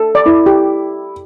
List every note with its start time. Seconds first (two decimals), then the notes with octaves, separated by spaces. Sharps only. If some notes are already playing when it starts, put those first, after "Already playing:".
Already playing: A4
0.15 D5
0.26 E4
0.46 G4